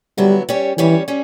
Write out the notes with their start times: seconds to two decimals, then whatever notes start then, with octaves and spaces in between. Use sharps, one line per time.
0.18 D3 F#3 G3 B3 E4
0.49 G3 C#4 G4 C#5
0.78 E3 G3 C#4 G4 C#5
1.08 G3 C#4